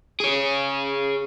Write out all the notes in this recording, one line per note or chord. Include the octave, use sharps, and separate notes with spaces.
G#4 C#5